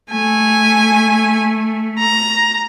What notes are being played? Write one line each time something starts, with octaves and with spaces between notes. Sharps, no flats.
A3 G#5
A#5